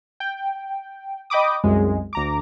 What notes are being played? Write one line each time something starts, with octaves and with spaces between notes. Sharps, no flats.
G5
D#5 G5 B5 D6 D#6
C2 F#2 G#3
D2 A#5 D6